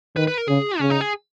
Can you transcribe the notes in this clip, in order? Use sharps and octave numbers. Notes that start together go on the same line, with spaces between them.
D#3 B4
B4
A#4
C#3 G#4
C#3 C#4
D#4
G#4